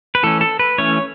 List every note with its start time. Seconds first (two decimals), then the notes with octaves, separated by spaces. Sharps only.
0.15 B4
0.23 E3 A3 C#4 A4
0.41 A4
0.59 B4
0.78 E3 A3 C#4 C#5